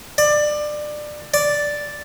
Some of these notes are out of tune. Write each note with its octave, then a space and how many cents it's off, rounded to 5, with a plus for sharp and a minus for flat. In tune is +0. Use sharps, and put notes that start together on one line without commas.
D5 +20
D5 -5